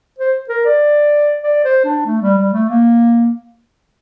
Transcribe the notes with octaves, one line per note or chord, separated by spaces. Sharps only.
C5
A#4
D5
D5
C5
D4
A3
G3
G3
A3
A#3